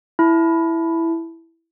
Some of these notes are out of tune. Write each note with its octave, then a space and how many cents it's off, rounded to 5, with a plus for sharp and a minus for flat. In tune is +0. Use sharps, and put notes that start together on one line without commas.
E4 +0 A5 -5